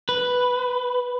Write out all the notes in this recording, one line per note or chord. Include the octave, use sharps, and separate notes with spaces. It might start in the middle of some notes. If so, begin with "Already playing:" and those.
B4